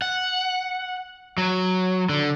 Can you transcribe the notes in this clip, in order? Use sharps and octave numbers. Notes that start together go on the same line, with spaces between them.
F#5
F#3
D3